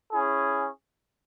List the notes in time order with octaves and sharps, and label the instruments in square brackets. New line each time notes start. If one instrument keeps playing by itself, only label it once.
[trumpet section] C#4 E4 G#4